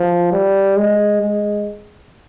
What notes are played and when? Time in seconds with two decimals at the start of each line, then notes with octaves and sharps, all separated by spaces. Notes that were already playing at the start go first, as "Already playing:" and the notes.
Already playing: F3
0.32 G3
0.77 G#3
1.21 G#3